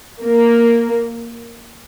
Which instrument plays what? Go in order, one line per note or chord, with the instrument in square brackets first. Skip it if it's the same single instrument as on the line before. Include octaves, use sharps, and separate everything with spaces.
[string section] A#3